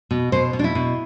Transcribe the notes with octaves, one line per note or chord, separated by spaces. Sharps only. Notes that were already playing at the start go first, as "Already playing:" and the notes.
B2
B2 C5
B2
D4
E4
B2